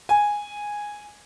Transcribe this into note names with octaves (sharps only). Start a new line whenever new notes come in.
G#5